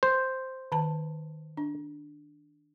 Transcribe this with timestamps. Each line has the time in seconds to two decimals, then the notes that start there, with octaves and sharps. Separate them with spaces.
0.03 C5
0.72 D#3 A5
1.57 D4